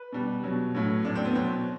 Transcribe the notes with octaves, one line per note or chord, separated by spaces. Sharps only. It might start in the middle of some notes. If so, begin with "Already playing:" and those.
Already playing: B4
B2 G3
B2 F#3
A2 F#3
A2 F#3 D4
C4
B3
B2 F#3 C4